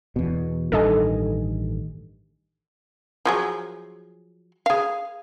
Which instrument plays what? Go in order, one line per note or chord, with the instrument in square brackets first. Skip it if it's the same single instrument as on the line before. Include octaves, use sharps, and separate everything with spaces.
[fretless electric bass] E2 B2
[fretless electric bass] A1 G2 D#3 [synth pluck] A4 D#5 G#5
[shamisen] F3 F#3 G#4
G#4 F5